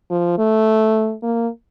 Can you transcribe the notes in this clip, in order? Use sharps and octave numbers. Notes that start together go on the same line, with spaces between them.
F3
A3
A#3